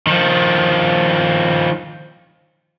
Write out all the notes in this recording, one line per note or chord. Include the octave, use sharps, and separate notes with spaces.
D#3 F3